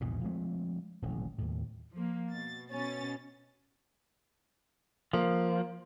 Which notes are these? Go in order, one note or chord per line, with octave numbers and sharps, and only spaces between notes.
A#1 E2 G#2 B2
F3 G#3 A3 C4
D#1 A1 C3 F#3
D#2 A2
F3 A#3
B2 A6
B2 C#4 A6
F3 A#3